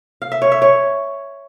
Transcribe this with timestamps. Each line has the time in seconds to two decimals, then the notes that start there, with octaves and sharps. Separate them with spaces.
0.22 F5
0.32 E5
0.42 C#5
0.52 E5
0.62 C#5